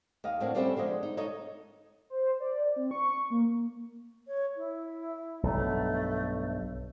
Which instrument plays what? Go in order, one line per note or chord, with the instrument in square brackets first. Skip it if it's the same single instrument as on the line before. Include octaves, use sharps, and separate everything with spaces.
[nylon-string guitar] D#2 D#5 F5
A2 C4 D4 F#4 A#4
G3 C4 C#4 G4 A4 E5
D3 F3 G#3 D#5
D#4
D#4 A4 C#5 D#5
[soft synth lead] C5
D5
C4
C#6
A#3
[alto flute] C#5
E4
[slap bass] B1 G2 [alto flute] A3